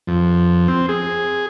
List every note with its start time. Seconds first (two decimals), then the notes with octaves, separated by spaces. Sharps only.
0.07 F2
0.68 C4
0.89 G#4